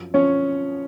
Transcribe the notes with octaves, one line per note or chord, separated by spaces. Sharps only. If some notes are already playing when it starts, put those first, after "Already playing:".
Already playing: F#2 F3
F3 C#4 C#5